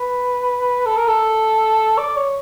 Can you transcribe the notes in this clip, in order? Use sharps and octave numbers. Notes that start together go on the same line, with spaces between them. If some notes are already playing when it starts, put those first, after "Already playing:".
Already playing: B4
A4
A#4
A4
D5
C#5